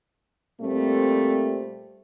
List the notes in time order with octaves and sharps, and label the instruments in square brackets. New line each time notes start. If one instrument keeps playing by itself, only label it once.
[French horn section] A#2 G3 A3 C4